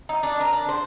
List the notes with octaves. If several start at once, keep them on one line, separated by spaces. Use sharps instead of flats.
D#4
D4
A#4
D4
C5